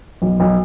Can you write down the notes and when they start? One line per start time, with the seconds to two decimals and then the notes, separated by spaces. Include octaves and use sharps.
0.22 B1
0.40 B1